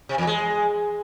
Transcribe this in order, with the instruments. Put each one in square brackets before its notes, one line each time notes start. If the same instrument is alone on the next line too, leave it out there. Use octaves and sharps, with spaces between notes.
[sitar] C3
E2
G#3